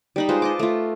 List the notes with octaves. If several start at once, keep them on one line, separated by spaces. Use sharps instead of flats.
G3 D#4 B5
G#3 F4 B4 C5
D#5 A5 D6
A3 F4